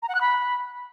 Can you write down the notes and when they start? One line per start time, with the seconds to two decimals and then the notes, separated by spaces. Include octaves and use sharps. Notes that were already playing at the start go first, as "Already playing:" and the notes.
0.02 A#5
0.09 F#5
0.15 F#6
0.21 B5